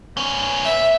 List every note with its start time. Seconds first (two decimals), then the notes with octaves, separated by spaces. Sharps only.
0.17 B3 C#4
0.64 E5